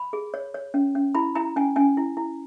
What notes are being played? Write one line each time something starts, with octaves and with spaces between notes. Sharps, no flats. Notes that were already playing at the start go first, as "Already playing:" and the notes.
Already playing: B5
G#4
C#5
C#5
C#4
C#4
E4 B5
E4 A#5
C#4 G#5
C#4 G#5
E4
E4